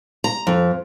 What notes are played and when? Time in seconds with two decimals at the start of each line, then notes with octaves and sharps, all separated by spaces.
0.24 A#5
0.47 F2